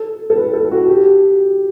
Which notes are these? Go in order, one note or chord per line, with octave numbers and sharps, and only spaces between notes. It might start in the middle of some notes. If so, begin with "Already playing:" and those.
Already playing: A4
A4
B4
A4
F#4
G4